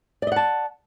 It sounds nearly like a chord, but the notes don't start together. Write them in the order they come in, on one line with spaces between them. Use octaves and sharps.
D5 D#5 F#5 A5